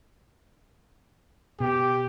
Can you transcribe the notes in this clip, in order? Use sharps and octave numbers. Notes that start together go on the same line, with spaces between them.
B2 G4